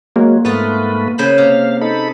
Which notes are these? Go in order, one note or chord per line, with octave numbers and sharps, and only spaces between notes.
F#3 G#3 A#3
G#2 A3 B3 F4 B4
C#3 C5 B5
C3 F5
D#4 A4 B5